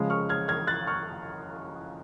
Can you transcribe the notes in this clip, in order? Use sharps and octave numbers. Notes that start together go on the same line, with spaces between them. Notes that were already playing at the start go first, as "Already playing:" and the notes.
Already playing: C#3 F3 G#3
C#6 F6
F6 G#6
F6 G#6
F#6 A6
C#6 F6